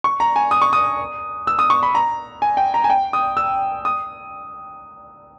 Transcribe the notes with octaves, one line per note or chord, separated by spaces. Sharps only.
C#6
A#5
G#5
D#6
C#6
D#6
E6
D#6
C#6
B5
A#5
G#5
G5
A#5
G#5
G5
D#6
E6
D#6